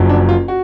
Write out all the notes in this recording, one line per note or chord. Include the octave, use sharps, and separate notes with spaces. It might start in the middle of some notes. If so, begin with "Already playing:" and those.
Already playing: F#1 F#2 F3
D4
F4
F#4